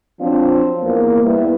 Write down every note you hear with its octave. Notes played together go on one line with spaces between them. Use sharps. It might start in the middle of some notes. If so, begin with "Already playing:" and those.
F3 F#3 C4 D4 F4
E2 A#3
G3 B3 E4